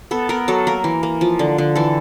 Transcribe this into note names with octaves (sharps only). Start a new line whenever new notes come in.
B3 A4
B3 A#4
F#3 A4
A#3 A#4
E3
A#3
F3
D3
D3
E3 A4